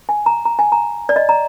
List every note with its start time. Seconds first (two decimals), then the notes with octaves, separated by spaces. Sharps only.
0.09 G#5
0.26 A#5
0.45 A#5
0.59 G#5
0.72 A#5
1.09 D5
1.16 D#5
1.29 A#5